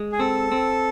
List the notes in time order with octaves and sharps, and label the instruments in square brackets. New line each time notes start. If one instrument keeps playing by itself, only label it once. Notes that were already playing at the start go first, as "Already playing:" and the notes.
Already playing: [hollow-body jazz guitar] G#3
[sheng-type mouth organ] G#4
[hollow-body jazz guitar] C4 [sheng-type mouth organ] A4
[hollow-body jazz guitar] C4